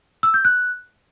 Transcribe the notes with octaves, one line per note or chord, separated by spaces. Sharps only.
E6
G6
F#6